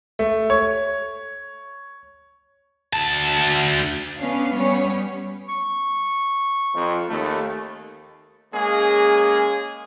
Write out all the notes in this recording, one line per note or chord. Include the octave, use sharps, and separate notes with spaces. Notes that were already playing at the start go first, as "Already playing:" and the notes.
A3
C#5
D2 A5
B3 C#4 D4 F5
G3 B3 C#4 C#5
C#6
F2
D#2 A3
G#3 A#3 C#4 G#4